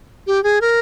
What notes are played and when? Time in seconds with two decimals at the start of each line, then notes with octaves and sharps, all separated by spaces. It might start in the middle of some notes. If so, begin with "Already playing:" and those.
0.27 G4
0.44 G#4
0.61 A#4